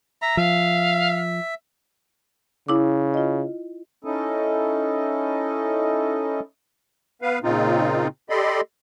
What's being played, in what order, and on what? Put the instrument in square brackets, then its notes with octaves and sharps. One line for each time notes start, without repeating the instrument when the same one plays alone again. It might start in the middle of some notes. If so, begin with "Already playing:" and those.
[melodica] E5 [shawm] A#5
[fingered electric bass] F3 [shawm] F5
[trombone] C#3 [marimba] E4 D6
[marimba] F4 D#5
[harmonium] C#4 D#4 E4 A4 D#5
[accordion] B3 B4 F5
A#2 C#3 C4 D#4 F4
G4 A4 D5 D#5 B5 C6